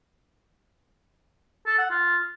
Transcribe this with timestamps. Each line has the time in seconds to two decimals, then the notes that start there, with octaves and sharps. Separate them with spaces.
1.67 A4
1.78 F#5
1.90 F4